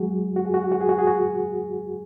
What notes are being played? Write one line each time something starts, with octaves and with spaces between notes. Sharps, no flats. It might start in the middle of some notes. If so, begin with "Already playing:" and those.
Already playing: F#3 G#3 F#4 G#4
F#4
G#4
F#4
G#4
F#4
G#4
F#4
G#4
F#4